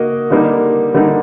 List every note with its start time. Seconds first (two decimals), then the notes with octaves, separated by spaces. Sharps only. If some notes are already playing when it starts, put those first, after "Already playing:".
Already playing: A#3 F#4 A#4 D#5
0.30 D3 G3 A#3 D#4
0.94 D3 G3 A#3 D#4